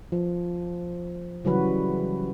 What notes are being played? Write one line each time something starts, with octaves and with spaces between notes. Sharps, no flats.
F3
C#3 E3 F#3 G3 F#4 B4